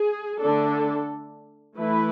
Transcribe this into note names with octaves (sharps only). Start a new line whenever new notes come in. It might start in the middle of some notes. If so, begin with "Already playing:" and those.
Already playing: G#4
D3 A3 D4 A4
E3 A3 E4 B4